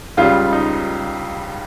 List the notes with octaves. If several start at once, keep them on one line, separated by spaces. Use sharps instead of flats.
C#2 C#3 G3 F4
D#4